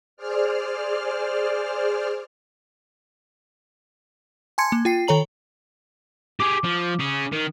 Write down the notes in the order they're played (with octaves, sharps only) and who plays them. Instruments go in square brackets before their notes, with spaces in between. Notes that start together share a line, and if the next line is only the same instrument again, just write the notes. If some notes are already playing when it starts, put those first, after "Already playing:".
[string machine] G#4 C5 D5 F6
[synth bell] G#5 A5 C6 G#6 C#7
A#3
F4 G5 C7
D#3 A4 C#5 A#5 F#7
[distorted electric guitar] G4 G#4 [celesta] D6
[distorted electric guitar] F3
C#4 G#4
D#3